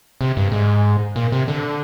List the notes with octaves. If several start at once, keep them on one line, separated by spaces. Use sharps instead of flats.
C3
G2
G#2
A#2
C3
D3